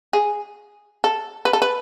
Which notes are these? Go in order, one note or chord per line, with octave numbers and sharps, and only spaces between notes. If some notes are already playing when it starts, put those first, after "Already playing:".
G#4
A4
B4
A4
B4